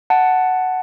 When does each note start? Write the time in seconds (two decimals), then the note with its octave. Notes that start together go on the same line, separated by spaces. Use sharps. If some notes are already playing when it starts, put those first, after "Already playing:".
0.10 F#5 A5